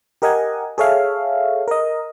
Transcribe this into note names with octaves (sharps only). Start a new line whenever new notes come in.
G4 A#4 D#5 F#5 G#5
G#4 A4 C#5 E5 F5
A#4 D#5